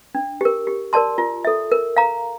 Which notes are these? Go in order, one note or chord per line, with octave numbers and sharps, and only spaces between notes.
D4
G4 A#4
G4
A#4 D5 A5 C6
F4
A4 E5
A#4
F5 A#5